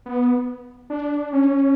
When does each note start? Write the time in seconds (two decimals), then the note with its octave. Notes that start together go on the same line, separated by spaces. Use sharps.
0.06 B3
0.90 D4
1.33 C#4